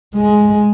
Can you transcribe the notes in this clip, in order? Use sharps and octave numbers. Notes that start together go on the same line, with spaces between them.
G#3